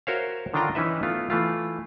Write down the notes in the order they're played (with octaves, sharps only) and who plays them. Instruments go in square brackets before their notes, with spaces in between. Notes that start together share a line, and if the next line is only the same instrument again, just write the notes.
[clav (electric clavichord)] F#4 A#4 C5 C#5 E5 F5
D3 D#3 D4 F4 G5 A#5
E3 C#4 D#4 B4 E5
A3 B3 F4
E3 A3 F4